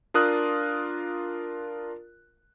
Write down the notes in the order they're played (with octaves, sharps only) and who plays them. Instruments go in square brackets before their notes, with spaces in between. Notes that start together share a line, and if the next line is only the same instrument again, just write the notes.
[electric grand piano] D4 F4 A#4 D#6 F#6